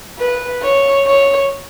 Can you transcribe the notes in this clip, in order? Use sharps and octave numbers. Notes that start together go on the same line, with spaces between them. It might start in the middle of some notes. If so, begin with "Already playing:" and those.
B4
C#5
C#5